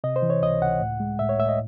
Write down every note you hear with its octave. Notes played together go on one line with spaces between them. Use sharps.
C3 D#5
C5
E3
C#5
C#2 D#5
C#2 F#5
A2
G#3
A2 E5
C#5
A2 E5
D#5